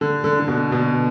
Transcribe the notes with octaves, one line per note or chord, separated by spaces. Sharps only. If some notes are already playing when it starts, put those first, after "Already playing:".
D3
D3
D3
B2
B2